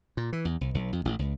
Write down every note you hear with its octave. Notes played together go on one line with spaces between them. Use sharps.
A#2
E3
E2
C2
B1
F2
A1
C#2